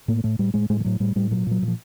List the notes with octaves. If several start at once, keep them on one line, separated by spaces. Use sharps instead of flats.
A2 A#3
A2 A3
A2 G3
A2 G#3
A2 G#3
F3
A2 F#3
A2 G3
A2 G3
A#2 F#3
A#2 F#3
A#2
F3